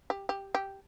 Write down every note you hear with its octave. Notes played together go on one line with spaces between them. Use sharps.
G4
G4
G4